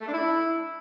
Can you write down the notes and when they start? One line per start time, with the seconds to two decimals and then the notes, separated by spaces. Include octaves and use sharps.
0.01 A3
0.07 D4
0.13 E4